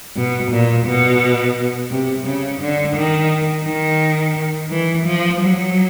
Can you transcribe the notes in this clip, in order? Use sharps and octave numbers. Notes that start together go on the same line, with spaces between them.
B2
A#2
B2
C3
C#3
D3
D#3
D#3
E3
F3
F#3